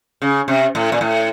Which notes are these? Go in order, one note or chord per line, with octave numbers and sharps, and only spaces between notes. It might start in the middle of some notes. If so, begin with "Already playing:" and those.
C#3
C3
A2
A#2
A2